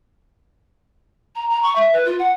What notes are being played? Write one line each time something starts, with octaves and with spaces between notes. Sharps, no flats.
A#5
A#5
C#6
E5
B4
F4
F#5